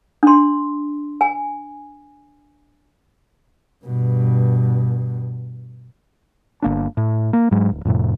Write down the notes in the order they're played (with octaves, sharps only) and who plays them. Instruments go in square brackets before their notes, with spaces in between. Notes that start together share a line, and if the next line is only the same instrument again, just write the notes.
[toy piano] D4 C6
G#5
[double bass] G2 B2
[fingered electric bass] G1 A#3 D4
A2
A#3
G#2 F#3 G#3
D1
F2 A2 C3